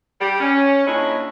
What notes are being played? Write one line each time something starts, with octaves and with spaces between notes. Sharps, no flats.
G3 G4
C#4
A#2 D4 E4 G#4 C#5 D#5